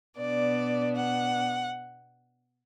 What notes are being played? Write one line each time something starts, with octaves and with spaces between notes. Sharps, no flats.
B2 B3 D4 D5
F#5